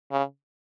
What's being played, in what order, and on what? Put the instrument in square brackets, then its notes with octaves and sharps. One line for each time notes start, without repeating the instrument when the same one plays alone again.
[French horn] C#3